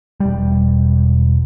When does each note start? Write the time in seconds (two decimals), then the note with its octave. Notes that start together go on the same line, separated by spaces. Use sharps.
0.20 E1 G3